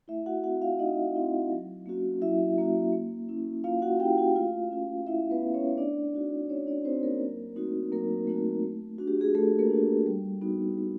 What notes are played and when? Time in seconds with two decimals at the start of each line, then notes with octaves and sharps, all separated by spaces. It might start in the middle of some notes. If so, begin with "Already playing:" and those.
0.08 A3 E4 E5
0.26 F#4 F#5
0.44 C4 E4 F#4 F#5
0.62 F4 F5
0.79 A3 D#4 D#5
1.16 C4 E4
1.51 F#3
1.86 A#3 C#4 F#4
2.21 F#3 E4 E5
2.58 A#3 C#4 F#4
2.93 A#3
3.29 C#4 E4
3.64 A#3 F4 F5
3.82 F#4 F#5
4.00 C#4 G4 G5
4.04 E4
4.18 F#4 F#5
4.35 A3 F4 F5
4.71 C#4 F4
5.07 A3 E4 E5
5.31 B3 B4
5.43 C#4 F4
5.54 C#4 C#5
5.78 A3 D4 D5
6.14 C4 D#4 F#4
6.49 A3 C#4 C#5
6.67 D4 D5
6.85 C4 D#4 F#4 C5
7.03 A#3 A#4
7.21 F#3
7.56 A3 C4 D#4 F#4
7.92 F#3 A#3 A#4
8.27 A3 C4 D#4 F#4
8.63 A3
8.98 D4 F#4
9.08 G4
9.21 G#4
9.35 A3 A4
9.59 A#3 A#4
9.70 D4 F#4
10.06 G3
10.42 B3 D#4 F#4
10.77 G3